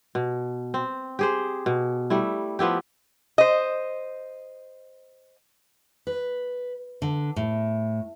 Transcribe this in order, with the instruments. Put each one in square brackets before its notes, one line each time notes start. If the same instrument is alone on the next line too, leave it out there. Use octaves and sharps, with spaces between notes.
[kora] B2
C4
G4 G#4 C5
B2
G3 A3 E4
F3 B3 E4 G4
[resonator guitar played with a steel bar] C5 D#5
[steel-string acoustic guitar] B4
D3
A2